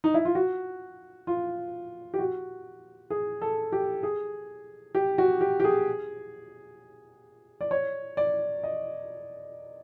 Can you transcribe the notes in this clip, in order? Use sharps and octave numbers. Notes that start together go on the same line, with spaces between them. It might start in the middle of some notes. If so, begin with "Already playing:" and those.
D#4
E4
F4
F#4
F4
G4
F#4
G#4
A4
G4
G#4
G4
F#4
G4
G4
G#4
D5
C#5
D5
D#5